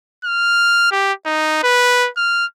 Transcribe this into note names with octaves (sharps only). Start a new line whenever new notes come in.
F6
G4
D#4
B4
F6